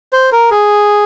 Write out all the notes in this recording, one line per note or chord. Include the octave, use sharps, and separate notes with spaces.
C5
A#4
G#4